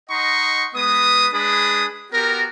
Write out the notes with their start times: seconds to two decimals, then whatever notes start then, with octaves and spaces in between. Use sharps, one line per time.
0.10 D#4 D#5 F#5 A#5 C6 C#6
0.75 G#3 B3 B4 D#6
1.33 G#3 D4 G#4 B4 B5 D#6
2.13 B3 F#4 G4 A#4